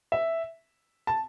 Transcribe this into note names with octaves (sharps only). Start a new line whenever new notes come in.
E5
A5